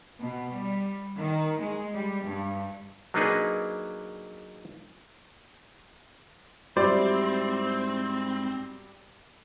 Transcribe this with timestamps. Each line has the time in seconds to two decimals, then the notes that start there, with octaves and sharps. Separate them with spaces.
0.20 B2
0.53 G3
1.16 D#3
1.60 G#3
1.93 G3
2.24 G2
3.14 F#3 A#3 D4 D#4 G#4 B4
6.77 G#2 F#3 G3 C4 E4 C5 D5